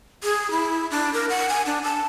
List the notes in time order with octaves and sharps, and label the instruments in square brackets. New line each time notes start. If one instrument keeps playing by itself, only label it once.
[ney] G#4
E4
D4
A#4
F#5
G#5
D4
A5